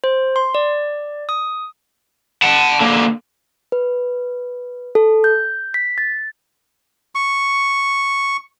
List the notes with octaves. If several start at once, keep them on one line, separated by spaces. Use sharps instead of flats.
C5
C6
D5
D#6
F#5 A5
D3 A#3
B4
A4
G6
B6
A6
C#6